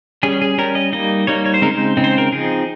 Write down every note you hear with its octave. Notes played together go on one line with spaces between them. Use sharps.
G3 C#4 G#4
G#4
G3 C#4 A#4
D#5
G3 A#3 D#4 D#5
G3 A#3 D#4 C#5
C#5
C5
C#3 G#3 C4 D#4 A#4
C5
C#3 G#3 C4 D#4
C5
A#4
F3 C4 D#4 G#4